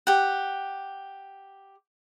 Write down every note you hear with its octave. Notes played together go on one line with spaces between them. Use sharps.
G4 F#5